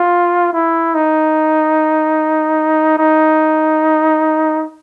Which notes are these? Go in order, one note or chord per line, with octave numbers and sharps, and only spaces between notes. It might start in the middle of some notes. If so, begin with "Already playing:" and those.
Already playing: F4
E4
D#4
D#4